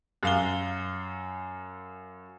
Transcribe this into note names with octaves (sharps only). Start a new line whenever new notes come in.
F#2 F5 G7